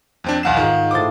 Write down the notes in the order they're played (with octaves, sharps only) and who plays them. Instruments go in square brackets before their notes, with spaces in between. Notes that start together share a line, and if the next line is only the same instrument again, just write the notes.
[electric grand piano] F2 C4 D4
[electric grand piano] B1 E2 E7 [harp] F5 F#5 C7
[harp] G#2 F4 [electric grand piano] D#3
[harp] A2 C5 D#6 [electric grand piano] D6 A6